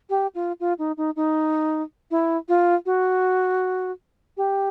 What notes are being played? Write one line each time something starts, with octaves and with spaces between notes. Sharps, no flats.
G4
F4
F4
D#4
D#4
D#4
E4
F4
F#4
G4